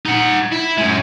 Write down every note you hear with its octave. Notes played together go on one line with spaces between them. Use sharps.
D#4 F#5
E4
F#2 G#3